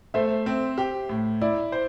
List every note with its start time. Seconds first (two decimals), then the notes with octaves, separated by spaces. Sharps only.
0.14 A3 C5 E5
0.46 C4
0.78 G4
1.09 A2
1.41 E4 D5
1.72 C5